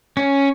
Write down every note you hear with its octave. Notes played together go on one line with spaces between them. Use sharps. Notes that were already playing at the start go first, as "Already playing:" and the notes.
C#4